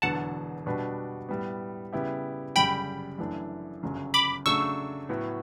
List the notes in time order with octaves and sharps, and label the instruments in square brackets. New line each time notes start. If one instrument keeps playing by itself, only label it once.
[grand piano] E1 E2 D3 F#3 B3 [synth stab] F#5 A5
[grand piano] B2 G3 D4 F#4 B4
A2 G3 B3
C#3 G3 B3 E4 G4
[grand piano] G1 F#2 C#3 G3 [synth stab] G5 B5
[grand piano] F#2 E3 A3 D4
G1 F#2 C#3 F#3
[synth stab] B5 D6
[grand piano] C#3 F#3 A3 D4 [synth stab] C#6 E6
[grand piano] A2 F#3 B3 F#4